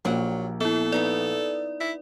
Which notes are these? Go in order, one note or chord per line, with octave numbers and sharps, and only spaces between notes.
A#1 F#3 A#3 G4 F#5
B3 E4 A4
B3 D#4 E4 D5
E4